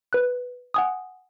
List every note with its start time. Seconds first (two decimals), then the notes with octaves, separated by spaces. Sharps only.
0.13 B4 F#6
0.74 F#5 G#5 D#6